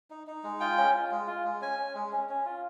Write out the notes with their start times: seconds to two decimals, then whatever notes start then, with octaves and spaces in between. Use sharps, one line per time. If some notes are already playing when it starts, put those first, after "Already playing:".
0.10 D#4
0.27 D#4
0.43 G#3
0.60 F4 G5
0.78 C#4
0.95 F4
1.11 G#3
1.27 F4
1.45 G#3
1.61 C#4 G#5
1.79 C#4
1.95 G#3
2.13 C#4
2.29 C#4
2.45 F4